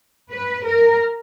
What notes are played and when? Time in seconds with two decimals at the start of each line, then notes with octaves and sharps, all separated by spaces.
0.31 B4
0.65 A#4